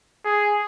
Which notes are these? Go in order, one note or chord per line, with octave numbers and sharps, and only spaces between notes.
G#4